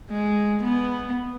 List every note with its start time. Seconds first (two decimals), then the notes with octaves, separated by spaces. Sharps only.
0.10 G#3
0.63 B3